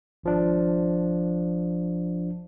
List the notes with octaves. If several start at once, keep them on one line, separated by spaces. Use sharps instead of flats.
G#1 F3 D4